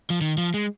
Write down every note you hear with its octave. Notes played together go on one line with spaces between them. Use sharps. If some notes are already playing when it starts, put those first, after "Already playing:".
F3
D#3
F3
G#3